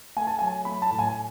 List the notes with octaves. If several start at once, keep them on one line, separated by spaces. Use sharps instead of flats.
A3 G#5
A5
F#3 G#5
A3 B5
A5
A2
G#5